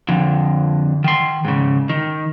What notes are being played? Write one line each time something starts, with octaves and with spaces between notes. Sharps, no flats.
F2 D3
D#3 C6
G#2 C#3
D#3